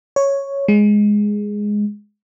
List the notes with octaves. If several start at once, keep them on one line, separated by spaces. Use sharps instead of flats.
C#5
G#3